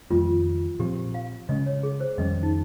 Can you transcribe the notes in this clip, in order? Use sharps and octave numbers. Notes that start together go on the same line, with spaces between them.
F2 D#3 G3 A#3 F4
A#2 F3 C4 G4
F5
C#3 G#3 C#4 D#5
C#5
G#4
C5
F2 D#3 G3 C#4 D#5
D#4